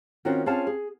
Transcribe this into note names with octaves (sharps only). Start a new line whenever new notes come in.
D#3 C4 C#4 F4 F#4 A#4
C4 C#4 F4 G#4 F5 A5
G#4